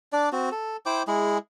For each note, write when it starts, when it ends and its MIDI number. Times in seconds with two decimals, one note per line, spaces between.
0.13 0.29 62
0.13 0.29 74
0.32 0.50 60
0.32 0.50 66
0.52 0.77 69
0.86 1.03 64
0.86 1.03 72
0.86 1.03 79
0.86 1.03 86
1.07 1.38 56
1.07 1.38 64
1.07 1.38 68